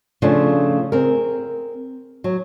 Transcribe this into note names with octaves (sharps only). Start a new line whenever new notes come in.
C#3 F3 A3 D4 F4
C4 G#4 A#4
F#3